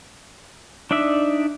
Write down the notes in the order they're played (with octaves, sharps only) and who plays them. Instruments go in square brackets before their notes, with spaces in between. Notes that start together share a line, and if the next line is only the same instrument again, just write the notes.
[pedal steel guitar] D4 D#4 D5 E5